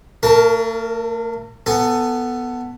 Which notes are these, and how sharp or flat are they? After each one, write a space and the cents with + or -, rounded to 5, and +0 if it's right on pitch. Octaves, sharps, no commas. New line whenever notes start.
A3 +45 A#4 +0 A5 +0
B3 +0 A4 +15 G#5 +0